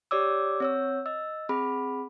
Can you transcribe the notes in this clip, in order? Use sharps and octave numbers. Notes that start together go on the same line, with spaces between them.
G4 C#5 D5 D6 E6
C4 C#5 E6
D#5 E6
C4 G#4 B5